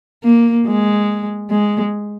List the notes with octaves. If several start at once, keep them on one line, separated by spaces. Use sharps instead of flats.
A#3
G#3
G#3